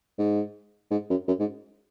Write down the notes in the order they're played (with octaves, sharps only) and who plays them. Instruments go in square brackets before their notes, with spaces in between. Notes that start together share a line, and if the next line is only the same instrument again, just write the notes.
[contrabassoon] G#2
G#2
F#2
F#2
G#2